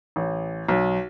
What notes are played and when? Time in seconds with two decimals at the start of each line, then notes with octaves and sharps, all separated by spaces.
0.16 A1
0.69 B1